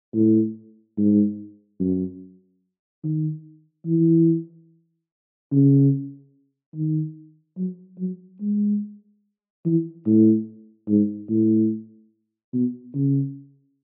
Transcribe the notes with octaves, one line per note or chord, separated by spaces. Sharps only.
A2
G#2
F#2
D#3
E3
C#3
D#3
F#3
F#3
G#3
E3
A2
G#2
A2
B2
C#3